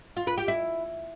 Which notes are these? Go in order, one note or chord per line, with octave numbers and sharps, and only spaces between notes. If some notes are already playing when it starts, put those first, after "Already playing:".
F4
B4
G4
E4